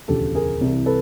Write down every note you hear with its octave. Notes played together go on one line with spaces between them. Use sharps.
E1 D2 C#3 F3 G4 A4
G#4 A#4
C2 C3 E3
A4 B4